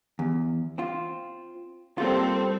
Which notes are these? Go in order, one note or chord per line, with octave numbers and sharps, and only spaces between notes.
E2
C4 F4
G3 A#3 C4 F4 A4